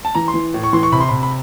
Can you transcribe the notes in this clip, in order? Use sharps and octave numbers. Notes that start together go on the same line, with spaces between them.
A5
E3 A#5
C6
E3
A2
C#6
E3 C6
C#6
C3 B5
C6
C3 B5
B5